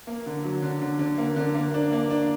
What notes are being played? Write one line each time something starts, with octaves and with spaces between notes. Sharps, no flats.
A#3
D3
F#3
D3
D3
D3
A#3
D3
A#3
D4
A#3
D4